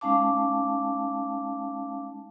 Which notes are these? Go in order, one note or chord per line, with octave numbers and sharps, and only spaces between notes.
G#3 C#4 D#4 F5 A5 D6